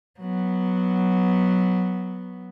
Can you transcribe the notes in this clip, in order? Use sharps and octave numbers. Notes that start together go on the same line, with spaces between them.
F#3 B3